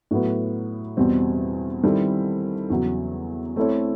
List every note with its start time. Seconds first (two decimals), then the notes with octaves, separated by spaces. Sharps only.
0.11 A2 F#3 B3
0.97 E2 B2 G3 C4
1.83 D#3 G3 C4 E4 A4
2.70 E2 C#3 F#3
3.56 A3 C4 E4 A4 C#5